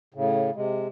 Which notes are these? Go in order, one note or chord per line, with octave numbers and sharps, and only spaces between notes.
A2 C#3
C3 G#3